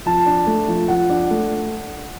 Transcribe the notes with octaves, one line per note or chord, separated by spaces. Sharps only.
F3 A5
D4
A3
F3
F3 F#5
D4
A3